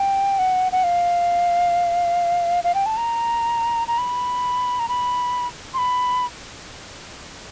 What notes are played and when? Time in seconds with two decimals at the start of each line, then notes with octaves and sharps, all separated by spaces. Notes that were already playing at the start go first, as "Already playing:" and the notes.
Already playing: G5
0.39 F#5
0.72 F#5
0.83 F5
2.64 F5
2.75 G5
2.86 A5
2.97 A#5
3.88 A#5
3.98 B5
4.79 A#5
4.89 B5
5.74 C6
5.78 B5